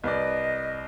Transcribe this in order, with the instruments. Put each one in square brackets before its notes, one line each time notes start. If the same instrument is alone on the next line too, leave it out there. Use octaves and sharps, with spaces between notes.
[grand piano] C2 B4 D5 [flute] D#5